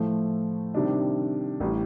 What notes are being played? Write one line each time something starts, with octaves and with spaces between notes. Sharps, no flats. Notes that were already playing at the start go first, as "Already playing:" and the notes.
Already playing: A2 F3 A3
C3 D#3 G3 D4
A1 A2 G3